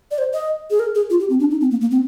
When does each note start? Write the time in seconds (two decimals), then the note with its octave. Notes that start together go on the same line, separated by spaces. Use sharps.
0.11 D5
0.18 C5
0.33 D#5
0.71 G#4
0.80 A#4
0.95 G#4
1.10 F4
1.20 G4
1.30 C4
1.40 D4
1.51 D#4
1.61 C4
1.71 A#3
1.81 A#3
1.91 C4